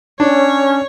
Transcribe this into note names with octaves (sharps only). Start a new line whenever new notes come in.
C#4 D4 C#5